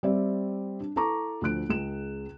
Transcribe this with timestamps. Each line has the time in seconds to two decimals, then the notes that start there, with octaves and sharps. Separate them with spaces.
0.03 G3 C4 D5 E5
0.80 D4
0.96 E4 A4 A5 A#5 C#6 D6
1.42 D2 F3 F#6 D7
1.69 C#2 G#4 E7